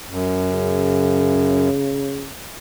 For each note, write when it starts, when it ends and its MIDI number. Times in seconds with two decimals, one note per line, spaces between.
0.10 1.69 42
0.52 2.29 49